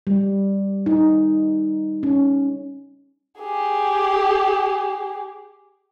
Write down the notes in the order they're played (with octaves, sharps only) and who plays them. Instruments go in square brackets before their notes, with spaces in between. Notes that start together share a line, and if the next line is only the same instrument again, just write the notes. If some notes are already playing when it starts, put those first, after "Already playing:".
[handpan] G3
D#4
C#4
[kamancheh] G4 G#4